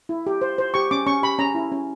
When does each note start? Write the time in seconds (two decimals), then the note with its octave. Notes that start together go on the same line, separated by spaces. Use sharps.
0.09 E4
0.27 G4
0.42 C5
0.58 C5
0.74 G4 C#6
0.91 C#4 D6
1.06 C#4 C#6
1.22 G4 B5
1.39 C#4 A#5
1.55 E4
1.72 C#4